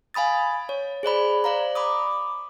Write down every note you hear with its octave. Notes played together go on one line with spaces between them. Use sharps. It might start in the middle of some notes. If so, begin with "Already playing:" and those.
F5 G#5 B5 D#6 A6
C#5
G#4 C5 D5 B5
C5 D5 F5 A#5
B5 D6 D#6